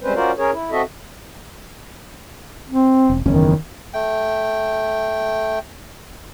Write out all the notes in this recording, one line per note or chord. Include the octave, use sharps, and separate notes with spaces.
G3 G#3 C4 C#4 B4 C5
C#4 F4 F#4 A#4 C5 D5
C#4 G#4 A#4 C#5
E4
C4 F#4 A4 D#5 E5
C4
E1
F#1 E2 D#3 C#4
A3 G5